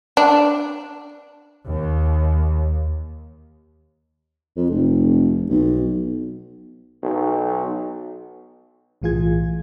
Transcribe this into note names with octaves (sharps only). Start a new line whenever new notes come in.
D4
D#2
F2
F1
B1
B1
B1 A2 E3 F4 G#4 G#6